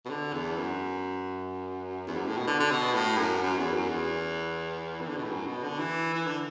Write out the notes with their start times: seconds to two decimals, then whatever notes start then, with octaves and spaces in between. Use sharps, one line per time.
0.06 B2
0.10 D3
0.33 E2
0.57 F#2
2.07 E2
2.16 F#2
2.27 A2
2.37 B2
2.47 D3
2.60 D3
2.71 B2
2.94 A2
3.18 F#2
3.42 F#2
3.58 E2
3.74 F#2
3.89 E2
5.01 E3
5.09 D3
5.17 B2
5.24 A2
5.32 F#2
5.47 B2
5.63 D3
5.79 E3
6.14 E3
6.27 D3